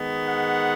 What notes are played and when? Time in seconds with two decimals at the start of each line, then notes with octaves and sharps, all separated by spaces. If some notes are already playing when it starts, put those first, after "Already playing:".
Already playing: D#3 G#3 B3
0.28 F#5